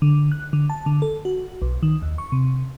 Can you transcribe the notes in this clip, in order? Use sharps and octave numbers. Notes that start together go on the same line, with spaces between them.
D3
F#6
D3
A5
D3
A4
F#4
B1
D#3
D#2
C#6
C3